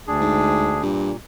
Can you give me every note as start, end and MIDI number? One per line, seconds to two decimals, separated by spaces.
0.07 0.82 38
0.07 0.82 62
0.07 0.82 68
0.21 0.71 44
0.83 1.11 43
0.83 1.16 46